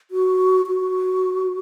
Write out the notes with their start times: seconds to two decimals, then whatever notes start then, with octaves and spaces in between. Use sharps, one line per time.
0.11 F#4
0.67 F#4